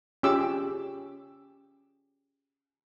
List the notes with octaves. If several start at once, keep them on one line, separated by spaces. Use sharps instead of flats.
C#4 F4 G4 G#4 D6 E6